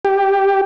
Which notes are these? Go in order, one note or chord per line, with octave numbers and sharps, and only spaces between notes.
G4